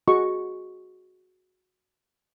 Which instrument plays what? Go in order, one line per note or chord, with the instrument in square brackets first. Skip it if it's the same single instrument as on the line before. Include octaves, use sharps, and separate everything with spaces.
[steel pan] F#4 G#4 D#5 C#6